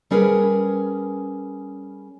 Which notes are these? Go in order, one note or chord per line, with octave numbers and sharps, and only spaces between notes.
G3 C#4 G#4 A#4 B4